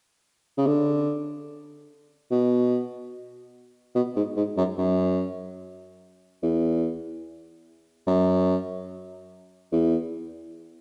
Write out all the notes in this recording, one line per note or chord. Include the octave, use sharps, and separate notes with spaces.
C#3
D3
B2
B2
G#2
G#2
F#2
F#2
E2
F#2
E2